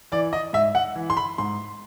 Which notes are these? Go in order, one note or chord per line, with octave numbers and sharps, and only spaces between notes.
E3 D5
D#5
G#2 E5
F#5
E3
C6
B5
G#2 C6